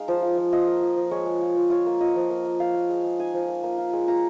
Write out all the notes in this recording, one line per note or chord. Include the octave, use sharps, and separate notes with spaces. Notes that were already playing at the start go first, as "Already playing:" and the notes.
Already playing: G#3 D#4 F5
F3
F4
F3
F4 D#5
A#3
F4
F3
G#3 C#5
G#3
F4
F3
F4 C#5
A#3
F4 D#5
F3
A#3
A#3
A#3 F5
A#3
G#3
G#3
D#4 G#5
F3
A#3
A#3
F4
G#3
F4 A#5